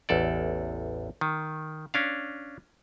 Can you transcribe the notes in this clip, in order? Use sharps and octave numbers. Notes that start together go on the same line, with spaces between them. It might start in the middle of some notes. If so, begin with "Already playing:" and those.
A1 E2 A4 D5
D#3
C#4 D4 F5